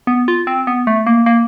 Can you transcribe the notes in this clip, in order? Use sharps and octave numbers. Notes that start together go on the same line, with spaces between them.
B3
F4
C4
B3
A3
A#3
A#3